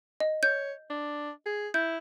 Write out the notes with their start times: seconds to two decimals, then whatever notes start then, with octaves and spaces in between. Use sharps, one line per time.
0.20 D#5
0.43 C#5 G6
0.90 D4
1.46 G#4
1.74 E4 G6